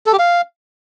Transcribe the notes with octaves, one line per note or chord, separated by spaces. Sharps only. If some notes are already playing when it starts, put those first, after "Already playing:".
A4
G4
F5